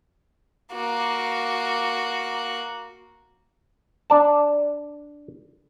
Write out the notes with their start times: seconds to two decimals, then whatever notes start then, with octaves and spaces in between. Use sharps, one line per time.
0.73 A#3 F#4
4.10 D4 D5 A5